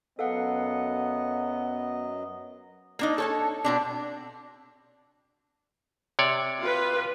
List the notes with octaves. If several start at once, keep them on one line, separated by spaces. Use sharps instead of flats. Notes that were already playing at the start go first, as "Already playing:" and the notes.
F#2 F#3 B3 A4 D#5 F5 F#5
A#3 D4 D#4
A4 C#5 A5
B2 C4 D4
C3 C#5 D5
F4 B4